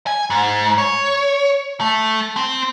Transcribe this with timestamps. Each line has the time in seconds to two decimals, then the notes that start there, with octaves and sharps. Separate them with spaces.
0.07 G#5
0.30 G#2
0.78 C#5
1.80 A3
2.37 C4